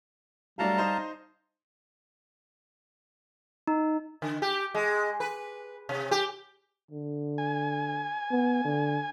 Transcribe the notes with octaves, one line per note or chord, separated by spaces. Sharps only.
F#3 G3 A3 D4 F5 A5 A#5
D#4 C5 D#6
D#4
D3
G4
G#3
B4
C3
G4
D3
G#5
B3
D3